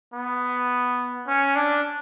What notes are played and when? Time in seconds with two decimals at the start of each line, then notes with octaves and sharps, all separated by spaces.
0.13 B3
1.27 C#4
1.56 D4